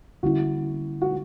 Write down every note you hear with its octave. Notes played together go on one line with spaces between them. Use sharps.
D3 G3 A#3 C#4 E4 F#4
F#4